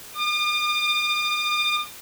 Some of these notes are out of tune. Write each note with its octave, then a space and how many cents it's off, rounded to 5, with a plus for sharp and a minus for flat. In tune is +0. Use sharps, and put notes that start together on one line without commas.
D6 +45